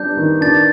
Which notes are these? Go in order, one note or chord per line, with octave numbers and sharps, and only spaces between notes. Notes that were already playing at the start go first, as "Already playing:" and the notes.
Already playing: G3 B3 D4 G6
D#3
D4 A6